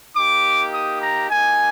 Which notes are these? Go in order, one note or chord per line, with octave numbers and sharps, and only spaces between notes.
A#3 D#4 G4 D6
D#6
A#5
A#3 D#4 G4 G#5